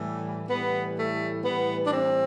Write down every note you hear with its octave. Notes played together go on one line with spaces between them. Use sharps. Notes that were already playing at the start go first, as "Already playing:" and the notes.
Already playing: A2 E3 G3
A2 E3 G3 B3
A3
A2 E3 G3 B3
D4
C4